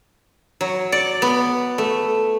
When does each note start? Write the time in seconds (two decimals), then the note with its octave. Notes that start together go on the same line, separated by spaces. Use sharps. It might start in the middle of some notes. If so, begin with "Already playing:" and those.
0.61 F#3
0.92 D5
1.22 B3
1.78 A3